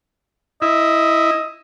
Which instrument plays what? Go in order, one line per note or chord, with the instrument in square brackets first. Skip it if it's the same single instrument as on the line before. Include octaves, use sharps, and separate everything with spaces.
[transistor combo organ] E4 [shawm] D#5